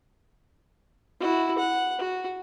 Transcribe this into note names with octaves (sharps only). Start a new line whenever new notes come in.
E4 F#4
F#5
F#4